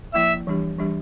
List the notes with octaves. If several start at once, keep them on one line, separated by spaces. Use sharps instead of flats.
F3 A#3 E4 E5
E3 G3 D4 G4
E3 G3 D4 G4